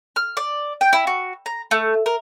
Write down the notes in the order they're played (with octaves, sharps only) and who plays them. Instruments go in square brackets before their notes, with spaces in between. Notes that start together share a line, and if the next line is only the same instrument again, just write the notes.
[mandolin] F6
D5
G5
E4
F#4
A#5
A3
A#4